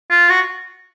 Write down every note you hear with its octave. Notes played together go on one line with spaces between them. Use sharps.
F4
F#4